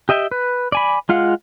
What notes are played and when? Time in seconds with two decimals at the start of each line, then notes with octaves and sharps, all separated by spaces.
0.09 G4 D#5 E5 G5
0.31 B4
0.72 D5 G#5 B5
1.09 G#3 F4 F5 F#5